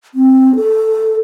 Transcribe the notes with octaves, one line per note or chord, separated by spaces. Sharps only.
C4
A4